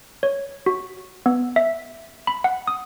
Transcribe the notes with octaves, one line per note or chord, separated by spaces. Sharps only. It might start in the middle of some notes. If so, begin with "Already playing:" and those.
C#5
F#4
B3
E5
B5
F#5
D#6